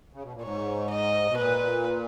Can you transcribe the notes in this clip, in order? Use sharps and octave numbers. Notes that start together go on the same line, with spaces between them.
C#3
B2
A#2
G#2 C#5
D#5
B2
A#2 B4